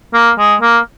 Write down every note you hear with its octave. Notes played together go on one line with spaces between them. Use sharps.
A#3
G#3
A#3